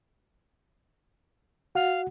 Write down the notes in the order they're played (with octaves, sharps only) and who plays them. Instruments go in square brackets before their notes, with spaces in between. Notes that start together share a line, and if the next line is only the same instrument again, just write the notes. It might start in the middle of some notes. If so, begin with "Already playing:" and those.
[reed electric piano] F#4 F#5 [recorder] F5